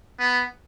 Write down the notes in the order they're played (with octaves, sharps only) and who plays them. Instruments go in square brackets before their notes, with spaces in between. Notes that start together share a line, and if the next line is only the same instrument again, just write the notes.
[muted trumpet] B3